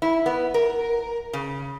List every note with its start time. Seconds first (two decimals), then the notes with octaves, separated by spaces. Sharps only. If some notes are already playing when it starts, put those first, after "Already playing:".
0.02 E4
0.26 B3
0.54 A#4
1.33 C#3